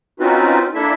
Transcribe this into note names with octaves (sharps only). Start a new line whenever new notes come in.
C4 C#4 D#4 F4 F#4 B4
A#3 D4 E4 A4 E5